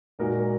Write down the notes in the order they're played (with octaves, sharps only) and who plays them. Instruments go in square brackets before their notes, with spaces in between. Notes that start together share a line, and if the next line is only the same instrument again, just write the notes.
[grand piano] A#2 G#3 D#4 F#4 A#4